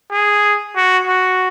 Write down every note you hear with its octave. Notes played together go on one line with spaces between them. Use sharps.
G#4
F#4
F#4